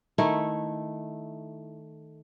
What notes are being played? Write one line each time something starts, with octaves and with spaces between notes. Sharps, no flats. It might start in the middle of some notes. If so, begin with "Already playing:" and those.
D#3 A3 E4